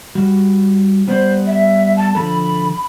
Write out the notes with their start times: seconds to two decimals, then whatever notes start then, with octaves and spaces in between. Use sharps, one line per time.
0.15 G3 F#4
1.08 G3 B3 C5 D5
1.46 E5
1.96 A5
2.15 D3 F3 A4 B5